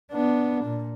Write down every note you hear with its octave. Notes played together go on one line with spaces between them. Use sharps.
B3 D4
A#2